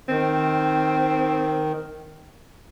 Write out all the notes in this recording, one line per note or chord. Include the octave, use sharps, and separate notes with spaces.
D#3 C4